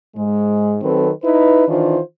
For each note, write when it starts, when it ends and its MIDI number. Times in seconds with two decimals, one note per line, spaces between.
0.16 0.77 44
0.16 0.77 56
0.82 1.09 51
0.82 1.09 54
0.82 1.09 60
0.82 1.09 69
0.82 1.09 71
1.23 1.67 63
1.23 1.67 64
1.23 1.67 71
1.68 1.98 51
1.68 1.98 52
1.68 1.98 62
1.68 1.98 65
1.68 1.98 72